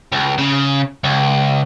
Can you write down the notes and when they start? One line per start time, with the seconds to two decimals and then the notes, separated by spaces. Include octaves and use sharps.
0.12 C#2
0.38 C#3
1.04 C#2